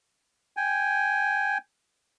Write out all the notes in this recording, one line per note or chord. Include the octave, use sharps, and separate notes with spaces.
G5 G#5